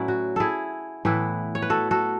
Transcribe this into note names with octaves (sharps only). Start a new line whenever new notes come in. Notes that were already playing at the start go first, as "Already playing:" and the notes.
Already playing: A2 F#3 C#4 E4 B4 D5 E5
F#4
E4 G#4 A4
A2 E3 B3 E4
C#5
B4
F#4 A4
F#4 A4